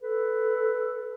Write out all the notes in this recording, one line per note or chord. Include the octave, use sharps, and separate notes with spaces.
A4 B4